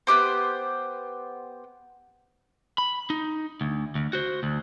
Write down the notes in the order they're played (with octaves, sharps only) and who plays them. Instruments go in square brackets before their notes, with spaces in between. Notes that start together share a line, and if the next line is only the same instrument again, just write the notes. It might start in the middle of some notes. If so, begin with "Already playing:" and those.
[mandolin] B3 E4 G4 C5
[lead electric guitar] B5
D#4
D2
D2
F#4 C5
D2